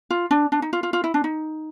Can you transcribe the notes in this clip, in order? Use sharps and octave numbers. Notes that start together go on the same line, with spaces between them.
F4
D4
D4
D#4
F4
F4
F4
E4
D4
D#4